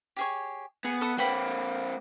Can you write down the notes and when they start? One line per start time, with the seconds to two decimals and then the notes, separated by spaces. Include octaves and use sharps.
0.16 G4 G#4 C#5
0.85 B3 G#4
1.01 A4 E5 D#6
1.18 A#3 C4 B4 F#5 G5